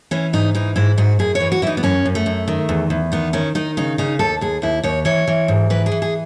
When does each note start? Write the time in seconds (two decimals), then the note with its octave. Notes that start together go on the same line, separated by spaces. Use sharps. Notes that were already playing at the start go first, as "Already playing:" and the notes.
0.11 E3 C#4
0.33 G#2 D#4
0.55 E3 D#4
0.76 G#2 E4
0.98 G#2 F#4
1.19 F#2 G#4
1.35 C#5
1.40 E3
1.52 F#4
1.62 E3 E4
1.67 D#4
1.77 B3
1.83 F#2 C#4
2.06 F#2
2.15 A3
2.26 F#2
2.48 D#3
2.69 E2
2.90 E2
3.12 D#3 B3
3.33 D#3 C#4
3.55 D#3 D#4
3.77 C#3 D#4
3.98 C#3 D#4
4.19 D#2 A4
4.41 D#2 G#4
4.62 D#2 E4
4.83 D#2 C#5
5.05 E3 C#5
5.28 E3
5.48 G#2
5.70 E3 B4
5.86 G#4
5.92 E3
6.02 G#4